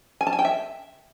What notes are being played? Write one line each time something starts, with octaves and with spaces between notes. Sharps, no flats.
G#5
A5
G#5
G5
E5